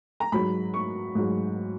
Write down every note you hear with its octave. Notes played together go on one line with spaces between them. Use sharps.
A#5
G#2 F#3 B5
C#6
G#2 F#3